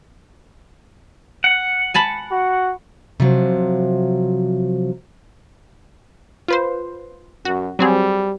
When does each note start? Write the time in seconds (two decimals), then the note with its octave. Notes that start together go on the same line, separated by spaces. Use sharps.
1.44 F#5
1.94 G#5 A5 B5
2.31 F#4
3.20 C3 F3 F#3
6.48 F4 B4 C5
7.45 F#2 F#4
7.79 F#3 G3 C4 G#4